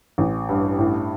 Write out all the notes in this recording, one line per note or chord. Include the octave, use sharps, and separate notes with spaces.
A1
G2
A2